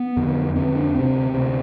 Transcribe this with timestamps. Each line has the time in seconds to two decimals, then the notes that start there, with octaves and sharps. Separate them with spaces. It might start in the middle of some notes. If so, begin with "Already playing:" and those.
Already playing: B3
0.17 F2 D3
0.56 F2 D3 C4
0.75 D4
0.95 D2 C3 C4
1.34 D2 C3